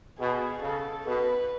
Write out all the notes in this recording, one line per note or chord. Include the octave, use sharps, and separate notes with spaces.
B2 G#4
C#3 A4
B2 B4